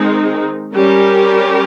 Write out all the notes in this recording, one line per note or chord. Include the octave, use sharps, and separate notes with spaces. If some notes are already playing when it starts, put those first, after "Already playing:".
Already playing: D#3 G#3 C4 D#4
G3 C#4 G4 A#4